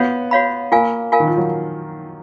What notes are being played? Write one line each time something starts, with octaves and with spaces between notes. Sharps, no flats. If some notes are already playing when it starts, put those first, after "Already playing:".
Already playing: B3 F#4 C#5 F5 B5
F#4 C#5 F5 B5
A#3 F4 A#4 F5 G#5
F4 A#4 F5 G#5
D#3
F3
F#3